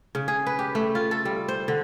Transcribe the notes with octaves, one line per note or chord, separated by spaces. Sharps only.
C#3
G#4
B4
G4
A3
F4
A4
G3
C5
D3